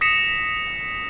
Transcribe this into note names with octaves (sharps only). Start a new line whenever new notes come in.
D#6 A#6 B6 C#7 E7